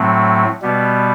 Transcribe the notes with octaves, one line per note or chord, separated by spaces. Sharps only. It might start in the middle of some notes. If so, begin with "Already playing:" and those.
Already playing: A2 F#3 A3 C4
B2 G3 B3